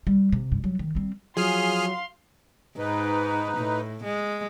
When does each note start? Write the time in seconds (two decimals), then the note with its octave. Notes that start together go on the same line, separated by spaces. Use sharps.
0.07 G3
0.32 C3
0.52 G2
0.64 F#3 G3
0.79 D#3
0.95 G3 C4
1.37 F3 F#3 G#4 F5 C6 F6
2.78 G#2 D#4 B4
3.57 A2
4.04 G#3